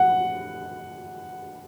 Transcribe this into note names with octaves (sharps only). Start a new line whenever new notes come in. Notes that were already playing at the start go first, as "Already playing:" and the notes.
Already playing: F#5